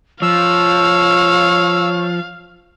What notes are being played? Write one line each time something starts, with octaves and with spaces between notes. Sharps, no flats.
F3 C#5 F5 E6